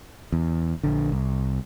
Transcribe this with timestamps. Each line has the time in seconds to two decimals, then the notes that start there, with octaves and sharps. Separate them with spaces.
0.32 E2
0.84 A#1 D3
1.12 C2